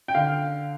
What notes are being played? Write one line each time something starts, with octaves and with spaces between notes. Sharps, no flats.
G5
D3 F5